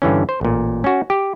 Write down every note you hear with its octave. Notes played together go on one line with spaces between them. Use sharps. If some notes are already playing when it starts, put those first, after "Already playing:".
G2 D3 E3 C#4
C5
A1 A#2
C#4 F#4
G4